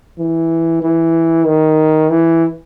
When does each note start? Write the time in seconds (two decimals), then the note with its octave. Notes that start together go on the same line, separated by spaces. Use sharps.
0.18 E3
0.82 E3
1.46 D#3
2.11 E3